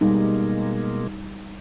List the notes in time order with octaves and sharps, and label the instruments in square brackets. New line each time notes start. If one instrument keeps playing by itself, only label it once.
[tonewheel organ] B2 G#3 A#3 [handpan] G3 D#4